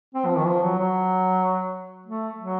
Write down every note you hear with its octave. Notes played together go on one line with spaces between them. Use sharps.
C4
F3
D#3
F3
F#3
F#3
A3
F#3